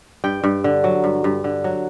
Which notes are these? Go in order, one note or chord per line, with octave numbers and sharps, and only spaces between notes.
G2 G5
G2
D3
F#3
G2
G2
D3
F#3